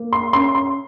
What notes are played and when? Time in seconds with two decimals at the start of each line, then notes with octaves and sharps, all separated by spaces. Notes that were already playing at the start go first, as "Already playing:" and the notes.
Already playing: A#3
0.13 C6
0.33 C#4 C6
0.55 C6